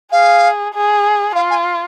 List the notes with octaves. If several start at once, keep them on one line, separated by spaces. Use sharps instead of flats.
G#4 F5
G#4
F4 F5
G#5